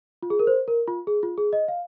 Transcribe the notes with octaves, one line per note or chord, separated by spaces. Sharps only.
F4
G#4
A#4
C5
A#4
F4
G#4
F4
G#4
D#5
F5